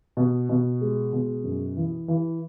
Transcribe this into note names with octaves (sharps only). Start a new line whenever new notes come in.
B2
B2
G#3
B2
F#2
E3
E3